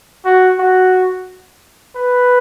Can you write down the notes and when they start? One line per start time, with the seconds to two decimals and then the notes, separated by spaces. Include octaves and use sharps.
0.25 F#4
0.59 F#4
1.96 B4